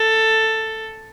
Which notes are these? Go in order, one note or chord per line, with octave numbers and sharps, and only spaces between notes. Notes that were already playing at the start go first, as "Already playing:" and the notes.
Already playing: A4